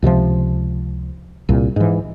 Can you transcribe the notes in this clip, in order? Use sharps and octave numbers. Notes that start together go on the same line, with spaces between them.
C#2 C3 D#3 F3
C2 A#2
G#2 E3